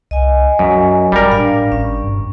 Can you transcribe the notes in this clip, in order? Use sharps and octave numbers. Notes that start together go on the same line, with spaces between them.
C2 D#5 G#5
F#2 F#3
G#1 G3 A#4
A2 D4 F5
G#1 C#4
G2